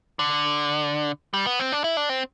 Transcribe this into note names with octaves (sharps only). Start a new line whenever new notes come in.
D3
G3
B3
C4
D4
E4
D4
C4